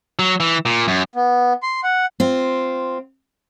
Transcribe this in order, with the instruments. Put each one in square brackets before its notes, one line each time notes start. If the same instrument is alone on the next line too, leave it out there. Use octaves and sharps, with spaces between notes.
[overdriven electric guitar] F#3
E3
A#2
F#2
[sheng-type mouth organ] B3
C6
F#5
[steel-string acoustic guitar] C4 F4